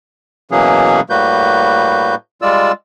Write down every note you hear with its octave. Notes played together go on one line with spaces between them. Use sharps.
B2 E3 F#3 A#3 C#4 G#4
A2 G3 A#3 F#4 B4 G6
G3 G#3 F4 D5 E6